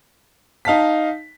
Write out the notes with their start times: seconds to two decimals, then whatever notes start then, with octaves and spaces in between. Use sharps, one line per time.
0.65 D#4 F5 A5 B6